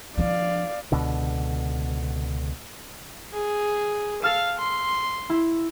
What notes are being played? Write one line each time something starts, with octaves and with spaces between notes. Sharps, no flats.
F3 D4 D5 F5
C#2 B2 D3
G#4
A4 F5 F6 E7
C6
E4